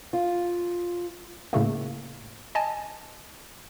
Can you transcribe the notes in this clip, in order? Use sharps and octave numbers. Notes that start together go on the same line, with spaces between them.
F4
A2 C#3 A3 A#3
D#5 G#5 A5